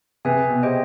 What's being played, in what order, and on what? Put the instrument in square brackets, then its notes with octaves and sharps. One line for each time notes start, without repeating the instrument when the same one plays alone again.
[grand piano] C3 [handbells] G#4 B4 E5 G#5
[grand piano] B2
[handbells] G4 C5 D#5 G5